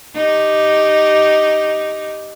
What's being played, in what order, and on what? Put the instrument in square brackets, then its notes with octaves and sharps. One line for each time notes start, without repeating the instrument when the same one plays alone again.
[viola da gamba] D#4 G4